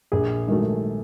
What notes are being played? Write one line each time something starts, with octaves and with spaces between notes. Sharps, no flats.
A#1 G#4
G#2 D#3 F#3 A3